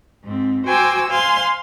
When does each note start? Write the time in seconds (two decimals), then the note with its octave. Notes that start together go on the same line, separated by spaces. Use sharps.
0.24 G#2 C4
0.66 F#4 C5 G5 G#5 D6 E6
1.09 C5 F5 G#5 C6